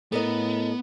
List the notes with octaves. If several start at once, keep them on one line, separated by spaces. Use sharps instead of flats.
A2 B3 A4 A#4 D#5